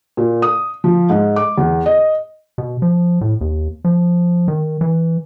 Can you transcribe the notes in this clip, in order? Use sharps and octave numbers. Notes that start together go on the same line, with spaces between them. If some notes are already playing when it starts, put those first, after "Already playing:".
A#2
D#6
F3
G#2
D6
E2
D#5
B2
F3
A2
D#2
F3
D#3
E3